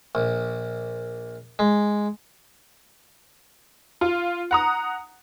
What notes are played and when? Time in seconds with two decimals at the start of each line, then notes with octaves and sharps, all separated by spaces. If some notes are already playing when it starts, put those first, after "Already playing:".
0.15 A#1
1.59 G#3
4.01 F4
4.51 F#5 A#5 D#6